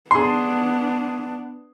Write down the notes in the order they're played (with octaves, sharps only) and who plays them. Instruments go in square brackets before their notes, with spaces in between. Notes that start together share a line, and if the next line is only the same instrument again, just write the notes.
[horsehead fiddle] B3 D4 [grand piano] G#4 C6